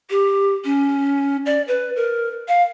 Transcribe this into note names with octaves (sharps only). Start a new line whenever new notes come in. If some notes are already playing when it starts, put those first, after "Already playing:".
G4
C#4
D5
B4
A#4
F5